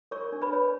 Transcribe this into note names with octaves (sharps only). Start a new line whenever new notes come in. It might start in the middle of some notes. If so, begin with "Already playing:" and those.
A#4 C#5 C#6
D4
B4 B5
C#5